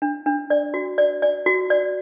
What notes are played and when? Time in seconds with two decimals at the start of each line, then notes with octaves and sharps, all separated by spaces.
0.02 D4
0.26 D4
0.50 D5
0.74 F#4
0.98 D5
1.22 D5
1.46 F#4
1.70 D5